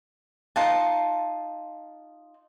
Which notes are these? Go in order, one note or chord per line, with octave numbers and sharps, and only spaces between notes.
D#4 F4 A5